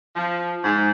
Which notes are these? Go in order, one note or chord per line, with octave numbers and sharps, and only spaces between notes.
F3
G#2